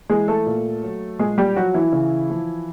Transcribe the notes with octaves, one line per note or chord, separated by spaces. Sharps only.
E3 G#3 G#4
A3 A4
A#2
F#3
A#2 G#3 G#4
G3 G4
F3 F#3 F#4
E3 E4
C#3
F3